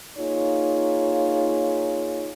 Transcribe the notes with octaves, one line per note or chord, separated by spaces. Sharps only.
A#3 D#4 F4 G#4 C#5